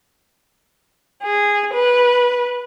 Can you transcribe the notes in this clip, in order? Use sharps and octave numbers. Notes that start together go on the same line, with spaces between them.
G#4
B4